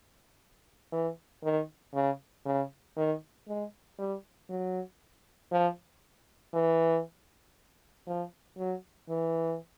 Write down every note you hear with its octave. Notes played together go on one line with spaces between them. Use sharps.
E3
D#3
C#3
C#3
D#3
G#3
G3
F#3
F3
E3
F3
F#3
E3